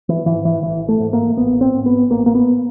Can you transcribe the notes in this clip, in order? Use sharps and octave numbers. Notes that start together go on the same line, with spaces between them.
E3
G#2 E3
E3
A1 E3
A3
G#2
A#3
A1 B3
C4
G#2
B3
A1 A#3
A#3
B3